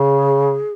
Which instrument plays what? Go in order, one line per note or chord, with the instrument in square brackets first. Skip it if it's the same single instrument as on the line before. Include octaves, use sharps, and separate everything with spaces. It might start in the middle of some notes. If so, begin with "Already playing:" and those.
Already playing: [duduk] C#3 [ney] G#4